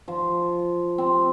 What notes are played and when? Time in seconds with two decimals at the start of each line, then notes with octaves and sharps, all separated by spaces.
0.08 F3
0.98 C4